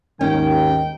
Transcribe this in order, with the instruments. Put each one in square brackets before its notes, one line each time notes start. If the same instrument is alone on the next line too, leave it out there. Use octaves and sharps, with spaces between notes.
[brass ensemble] D#2 G#2 D#3 [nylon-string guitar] C#4 [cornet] G5